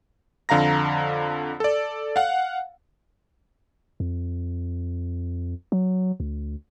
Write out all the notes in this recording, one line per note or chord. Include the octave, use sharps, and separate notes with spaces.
F2 D3 F5 A#5 A#6
A4 D5
F5 F#5
F2
F#3
D2